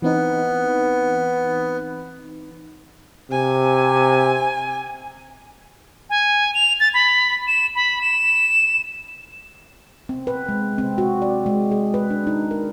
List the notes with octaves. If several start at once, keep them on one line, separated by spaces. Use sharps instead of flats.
E3 B3 C4 D#4
C3 G#5
G#5
F7
A6
B5
E7
B5
E7
C4
B4
G#3
C4
F#4
D5
G#3
G#4
B4
D4
D#4
A#4